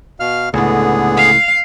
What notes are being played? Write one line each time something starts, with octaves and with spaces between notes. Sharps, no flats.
B2 F5 F6
C#2 A2 D3 B3 G#4
F5